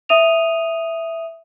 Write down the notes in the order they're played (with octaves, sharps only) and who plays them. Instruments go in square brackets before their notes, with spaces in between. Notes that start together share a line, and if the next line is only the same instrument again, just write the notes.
[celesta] E5 D#6 D#7 F7